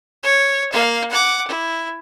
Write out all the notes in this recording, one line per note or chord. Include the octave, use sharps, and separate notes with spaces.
C#5
A#3 F5
F#5 D6
E4